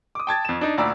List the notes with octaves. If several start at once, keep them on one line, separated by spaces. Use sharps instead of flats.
D6 D#6
G5 A5 G#6 A6
F2 E7
D4 D#4
D2 A#2 D5 A#5 B5 E6